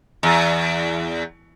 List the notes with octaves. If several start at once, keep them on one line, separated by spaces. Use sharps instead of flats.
E2